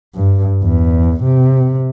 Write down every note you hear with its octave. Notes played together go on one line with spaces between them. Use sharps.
G2
E2
C3